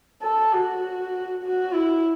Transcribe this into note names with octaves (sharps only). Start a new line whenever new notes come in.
A4
F#4
F#4
E4